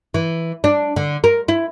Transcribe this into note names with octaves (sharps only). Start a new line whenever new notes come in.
E3
D4
D3
A#4
E4